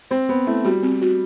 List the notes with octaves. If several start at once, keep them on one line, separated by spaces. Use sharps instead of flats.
C4 C5
B3 C5
A3 E4
G3 F#4
C4
F#4